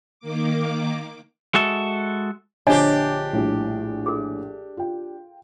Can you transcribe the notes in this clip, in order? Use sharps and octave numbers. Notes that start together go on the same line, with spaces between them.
D#3 A#3 D6
G#3 F#4 A4 E5
A#1 D3 D4 G4 C5 C#5 D#5 G#5
A#1 A2 G3
G#4 A4
F4 G5